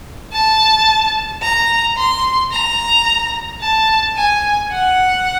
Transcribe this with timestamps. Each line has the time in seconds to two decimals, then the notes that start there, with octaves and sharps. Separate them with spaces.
0.32 A5
1.42 A#5
1.97 C6
2.51 A#5
3.61 A5
4.16 G#5
4.71 F#5